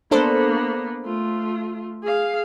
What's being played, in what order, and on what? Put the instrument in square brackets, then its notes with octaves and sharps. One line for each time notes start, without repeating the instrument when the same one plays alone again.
[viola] A#3 B3 [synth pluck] D4 A4 C5
[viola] A3 F4
G#4 F5